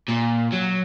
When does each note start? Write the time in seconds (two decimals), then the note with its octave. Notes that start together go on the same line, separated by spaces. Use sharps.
0.08 A#2
0.52 F#3